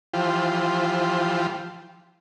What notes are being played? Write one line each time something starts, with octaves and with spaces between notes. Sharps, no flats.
E3 F3 F4 G4 C5